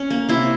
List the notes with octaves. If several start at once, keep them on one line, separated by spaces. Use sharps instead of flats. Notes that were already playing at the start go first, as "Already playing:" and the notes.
Already playing: C#4
A#3
C3 E4